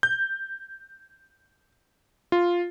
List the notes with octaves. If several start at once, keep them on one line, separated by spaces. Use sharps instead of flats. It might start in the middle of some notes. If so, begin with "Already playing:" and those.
G6
F4